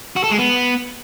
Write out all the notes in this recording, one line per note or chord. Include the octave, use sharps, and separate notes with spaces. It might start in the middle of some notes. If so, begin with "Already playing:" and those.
F#4
A4
G#3
B3